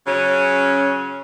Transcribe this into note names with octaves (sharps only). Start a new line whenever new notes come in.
C#3 F#3 C#4